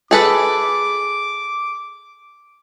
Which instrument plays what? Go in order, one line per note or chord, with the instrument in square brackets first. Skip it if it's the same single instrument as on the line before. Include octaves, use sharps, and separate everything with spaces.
[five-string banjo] G#4 A4 B4 [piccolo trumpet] D6